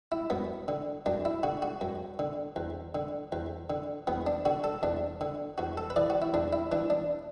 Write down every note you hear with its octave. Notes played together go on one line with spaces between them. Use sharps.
E4
F#2 B3
D3
F#2 D4
E4
D3 F#4
F#4
F#2
D3
E2
D3
E2
D3
E2 B3
D4
D3 F#4
A4
E2 D4
D3
E2 F#4
A4
B4
E3 D5
F#4
E4
E2 D4
E4
E3 D4
D4